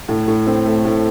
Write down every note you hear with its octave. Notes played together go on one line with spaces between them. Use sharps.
A2
A2
C4
A3
A2